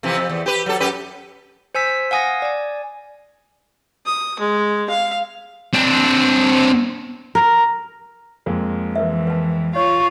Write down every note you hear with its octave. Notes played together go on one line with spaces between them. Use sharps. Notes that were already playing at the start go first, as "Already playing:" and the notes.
F2 C3 E3
F2
E2
G4 B4
F#3 A4
F#2 G4 B4
C5 G#5 E6 B6
F5 F#5 G#5 D#6 A#6
D5 G#5
D#6
G#3
F5
C4 D4
A#4
F2 G#3 A#3
E3 A#4 B4 E5
B4 A5
F4 C#5 C#6